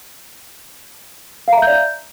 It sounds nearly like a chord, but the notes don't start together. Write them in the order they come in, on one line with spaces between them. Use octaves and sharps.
F5 A#5 E5 G6 D5